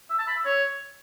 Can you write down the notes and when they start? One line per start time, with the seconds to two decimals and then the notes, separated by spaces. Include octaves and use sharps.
0.10 E5
0.19 A5
0.27 B5
0.36 E5
0.45 C#5